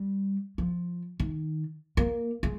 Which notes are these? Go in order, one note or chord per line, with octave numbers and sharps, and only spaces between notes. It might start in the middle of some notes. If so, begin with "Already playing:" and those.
Already playing: G3
F3
D#3
A#3
G#3